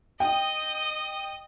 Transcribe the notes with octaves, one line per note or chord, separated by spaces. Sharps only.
D#5 G5 D#6